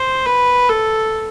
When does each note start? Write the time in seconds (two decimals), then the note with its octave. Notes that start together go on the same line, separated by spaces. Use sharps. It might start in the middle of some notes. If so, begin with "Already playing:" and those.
Already playing: C5
0.26 B4
0.69 A4